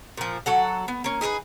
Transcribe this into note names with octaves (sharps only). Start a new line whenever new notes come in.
A#2 F3
F#3 A4 F#5
B3
A#3 C#4
D#4 G#4 A#4 B4